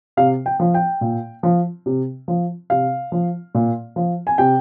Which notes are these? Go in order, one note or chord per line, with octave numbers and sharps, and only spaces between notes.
C3 F5
G5
F3
G5
A#2
F3
C3
F3
C3 F5
F3
A#2
F3
G#5
C3 G5